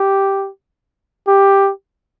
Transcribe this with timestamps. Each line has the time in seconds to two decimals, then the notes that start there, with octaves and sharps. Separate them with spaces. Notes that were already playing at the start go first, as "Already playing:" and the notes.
Already playing: G4
1.28 G4